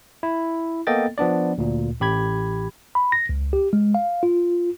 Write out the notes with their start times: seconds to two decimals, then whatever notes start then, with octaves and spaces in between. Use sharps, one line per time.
0.23 E4
0.87 A#3 B3 A4 D#5 G5 A6
1.18 F3 B3 D4 D5
1.58 D2 A#2
2.01 A1 G4 B5 G#6
2.95 B5
3.12 A#6
3.29 C#2
3.53 G4
3.73 G#3
3.95 F5
4.23 F4